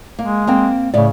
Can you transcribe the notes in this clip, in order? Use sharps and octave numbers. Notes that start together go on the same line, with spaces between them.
G#3 A#3
A#3 C4 G5
A2 C#3 D5